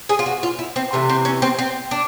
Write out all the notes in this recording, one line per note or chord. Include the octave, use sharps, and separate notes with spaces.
G#4
F4
F#4
F4
E4
C4
C3 E3 A3
C4
C#4
C4
C4
D4